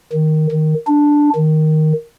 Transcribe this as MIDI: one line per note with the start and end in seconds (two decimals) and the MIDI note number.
0.12 0.46 51
0.51 0.74 51
0.87 1.30 62
1.35 1.92 51